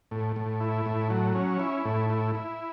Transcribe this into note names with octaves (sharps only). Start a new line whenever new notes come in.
A2
A2
E4
A2
F#3
C#4
E4
A2
E4
E4